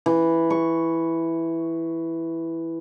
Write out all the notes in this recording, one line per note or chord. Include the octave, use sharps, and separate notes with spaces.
E3
C#6